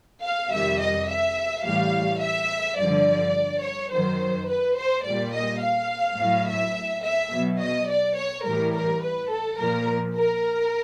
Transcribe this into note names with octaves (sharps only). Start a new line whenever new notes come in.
F5
F2 C3 D#3 G3 E5
D#5
E5
A2 E3 G3 F5
E5
G2 D3 F3 D5
C#5
F#2 D#3 F#3 C5
B4
C5
A#2 G3 D5
D#5
F5
A2 F#3
E5
E5
B2 F#3
D#5
D5
C#5
A2 E3 G3 A#4
A#4
B4
A4
A#2 F3 A#4
A#4